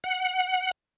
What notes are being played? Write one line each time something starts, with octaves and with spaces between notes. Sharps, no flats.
F#5